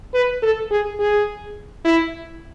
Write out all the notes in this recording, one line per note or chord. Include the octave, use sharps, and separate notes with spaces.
B4
A4
G#4
G#4
E4